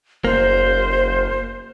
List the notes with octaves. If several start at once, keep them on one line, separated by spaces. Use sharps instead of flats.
F#1 A#3 C5